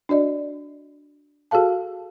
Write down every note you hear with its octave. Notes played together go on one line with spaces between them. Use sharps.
D4 F#4 D5 D#5
F#4 G#4 A4 F5 A5